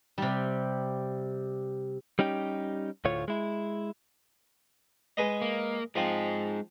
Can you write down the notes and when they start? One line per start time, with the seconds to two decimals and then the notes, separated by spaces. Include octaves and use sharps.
0.18 C3 G3
2.19 G3 C#4 D#4 G4
3.05 D2 A2 A3 F4 C#5
3.28 G#3 E4
5.17 G#3 B4 D#5
5.42 A#3
5.96 F3 G#3 C4 D#4